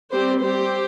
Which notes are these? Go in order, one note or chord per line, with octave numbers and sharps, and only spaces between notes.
G3 C4 G4 C5
G3 C4 G4 C5